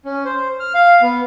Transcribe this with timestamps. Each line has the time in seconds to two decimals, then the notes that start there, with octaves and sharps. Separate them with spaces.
0.05 C#4
0.25 C5
0.60 F6
0.74 F5
1.02 B3